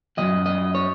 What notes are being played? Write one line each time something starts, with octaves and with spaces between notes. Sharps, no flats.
F#2 C#3 F#3 D#5
D#5
C#5